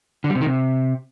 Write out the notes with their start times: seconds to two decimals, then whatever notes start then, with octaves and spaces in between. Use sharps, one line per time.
0.24 D3
0.30 G3
0.35 C3
0.41 D#3
0.46 C3